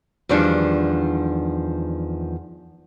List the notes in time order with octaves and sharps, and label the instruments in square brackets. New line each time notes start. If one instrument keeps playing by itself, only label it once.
[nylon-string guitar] E2 D#3 F3 G3 D4